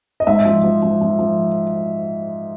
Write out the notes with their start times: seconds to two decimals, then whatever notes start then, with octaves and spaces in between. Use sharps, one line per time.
0.20 D#5
0.27 G#2 E5
0.45 F3
0.63 F3
0.82 F3
1.01 F3
1.19 F3